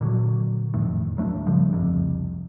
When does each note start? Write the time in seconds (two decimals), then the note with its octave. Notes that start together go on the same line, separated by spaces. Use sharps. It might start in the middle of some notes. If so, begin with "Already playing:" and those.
0.01 A#2 D3 E3 F#3
0.74 E1 F2 A2 D#3
1.17 D1 F#3 A3 D4
1.47 G1 C#3 F3 G3
1.73 F1 C2 F2 C3